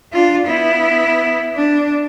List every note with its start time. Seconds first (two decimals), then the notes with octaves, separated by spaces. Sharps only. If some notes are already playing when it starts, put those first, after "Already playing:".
0.13 D4 F4
0.46 B3 E4
1.55 D4